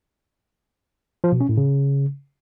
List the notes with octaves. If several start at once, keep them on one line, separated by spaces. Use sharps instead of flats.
F3
B2
C#4
A2
C#3